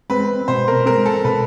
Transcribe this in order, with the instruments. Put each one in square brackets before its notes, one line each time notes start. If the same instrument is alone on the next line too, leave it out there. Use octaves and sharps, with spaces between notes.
[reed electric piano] G#3 C4 [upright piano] B4
[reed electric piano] B2 [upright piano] C5
[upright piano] A#4
[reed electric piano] G#3 C4 [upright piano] A#4
[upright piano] A4
[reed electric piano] B2 [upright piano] B4